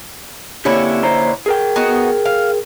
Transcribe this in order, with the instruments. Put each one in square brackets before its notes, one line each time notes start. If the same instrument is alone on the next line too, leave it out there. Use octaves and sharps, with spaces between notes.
[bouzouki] D3 C#4 E4 [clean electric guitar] A#3 C4 G4
[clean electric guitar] A#2 C5 A#5
G#4 A#4 G5
[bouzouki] B3 D#4 F#4
F5